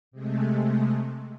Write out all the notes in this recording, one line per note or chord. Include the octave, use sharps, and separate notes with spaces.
C3 G#3 A3